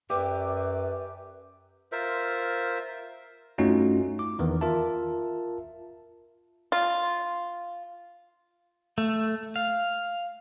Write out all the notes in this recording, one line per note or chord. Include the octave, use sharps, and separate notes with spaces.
F#2 G4 B4 D5 E5
F4 A#4 C5 E5
G2 A3 C#4 D#4 F4 F#4
D6
E2 D#3 E3
F4 A#4 E5 A5
F4
A3
F5